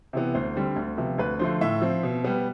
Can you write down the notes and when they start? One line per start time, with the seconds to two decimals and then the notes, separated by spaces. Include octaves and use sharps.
0.13 C3 E3 B3
0.35 D2 C5
0.56 D3 G3 C4
0.76 D2
0.98 C3 F3 B3
1.18 D2 B4
1.39 D3 F3 A3 C5
1.61 A2 E5
1.82 F3 C4
2.03 B2
2.24 G3 B3